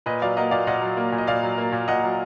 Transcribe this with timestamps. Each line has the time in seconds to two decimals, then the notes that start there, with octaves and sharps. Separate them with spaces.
0.06 A#2 B4 D#5
0.22 F#3 D5 F5
0.37 A#3 D#5 F#5
0.51 A#2 D5 F5
0.67 A#2 D#5 F#5
0.82 F#3
0.97 A#3
1.12 A#2
1.18 D#5
1.27 A#2 D5 F5
1.43 F#3
1.58 A#3
1.72 A#2
1.88 A#2 D#5 F#5
2.03 F#3